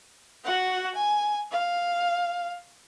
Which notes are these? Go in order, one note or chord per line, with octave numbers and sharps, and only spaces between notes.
F#4 F#5
G#5
F5